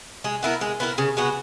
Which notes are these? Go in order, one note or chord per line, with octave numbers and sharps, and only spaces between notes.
G#3
B3 E4 A#4
G#3
B3 E4 A#4
C#3
G#3 B3 F#4